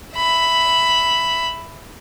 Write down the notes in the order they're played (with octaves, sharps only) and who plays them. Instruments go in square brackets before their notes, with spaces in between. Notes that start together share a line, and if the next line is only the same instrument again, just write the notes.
[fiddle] E5 B5